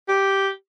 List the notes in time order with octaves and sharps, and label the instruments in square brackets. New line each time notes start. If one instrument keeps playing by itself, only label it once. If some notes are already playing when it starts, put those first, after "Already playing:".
[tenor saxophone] G4